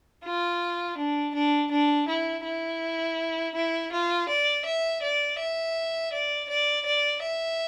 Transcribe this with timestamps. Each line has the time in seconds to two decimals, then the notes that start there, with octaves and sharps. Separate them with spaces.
0.24 F4
0.97 D4
1.34 D4
1.71 D4
2.08 E4
2.44 E4
3.55 E4
3.92 F4
4.29 D5
4.66 E5
5.02 D5
5.39 E5
6.12 D5
6.49 D5
6.86 D5
7.23 E5